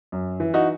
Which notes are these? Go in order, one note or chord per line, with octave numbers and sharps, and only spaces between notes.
F#2
E3
D#4 F#4